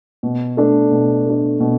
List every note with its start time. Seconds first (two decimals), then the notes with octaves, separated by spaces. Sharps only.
0.23 B2
0.57 A3 D4
0.91 B2
1.26 A3 D4
1.60 B2